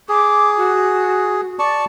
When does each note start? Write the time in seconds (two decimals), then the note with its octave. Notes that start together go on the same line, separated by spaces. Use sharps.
0.09 G#4 D6
0.57 F#4
1.59 D5 A5 C#6